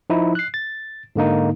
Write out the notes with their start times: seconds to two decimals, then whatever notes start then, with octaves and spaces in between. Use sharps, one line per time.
0.10 F3 D#4 E4
0.35 F#6 C7
0.54 A6
1.16 G#2 D3 A#3 D#4